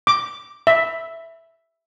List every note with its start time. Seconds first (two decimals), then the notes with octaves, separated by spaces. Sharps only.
0.07 D6
0.67 E5